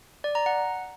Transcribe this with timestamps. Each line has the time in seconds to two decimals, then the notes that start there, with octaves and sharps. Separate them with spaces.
0.24 D5
0.35 A#5
0.46 F#5